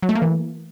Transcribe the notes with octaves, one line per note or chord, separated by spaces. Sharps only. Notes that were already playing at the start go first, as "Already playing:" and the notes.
F#3
A3
A#3
E3